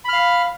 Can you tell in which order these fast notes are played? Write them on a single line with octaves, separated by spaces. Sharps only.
B5 F6 F5